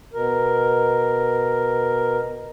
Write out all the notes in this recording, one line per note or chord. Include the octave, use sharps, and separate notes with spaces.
B2 A#4